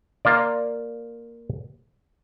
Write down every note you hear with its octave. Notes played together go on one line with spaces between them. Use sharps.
A#3 F4 D5